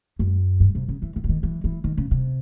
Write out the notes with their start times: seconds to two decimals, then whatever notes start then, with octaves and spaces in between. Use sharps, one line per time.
0.19 F#2
0.60 G2
0.75 C3
0.88 C#3
1.02 E3
1.16 E3
1.24 D3
1.29 D#3
1.43 E3
1.64 E3
1.84 D#3
1.97 C#3
2.11 C3